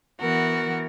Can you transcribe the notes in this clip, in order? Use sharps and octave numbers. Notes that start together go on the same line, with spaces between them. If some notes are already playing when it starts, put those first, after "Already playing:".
E3 B3 F#4 A#4